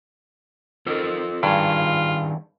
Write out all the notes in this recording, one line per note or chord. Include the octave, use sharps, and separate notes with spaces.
D#3 F4 A4 C5
G2 D#3 G3 F4 G#4